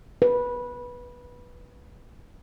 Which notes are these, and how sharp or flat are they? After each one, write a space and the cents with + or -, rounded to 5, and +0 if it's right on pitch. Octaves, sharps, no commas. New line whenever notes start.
B4 -15